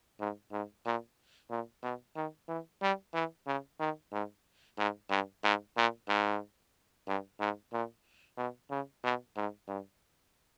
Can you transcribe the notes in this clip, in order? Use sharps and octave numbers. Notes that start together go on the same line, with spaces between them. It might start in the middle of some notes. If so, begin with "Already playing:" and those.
G#2
G#2
A#2
A#2
B2
D#3
E3
G3
E3
C#3
D#3
G#2
G#2
G2
G#2
A#2
G#2
G2
G#2
A#2
B2
C#3
B2
G#2
G2